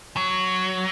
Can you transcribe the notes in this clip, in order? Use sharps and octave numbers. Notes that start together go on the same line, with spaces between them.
F#3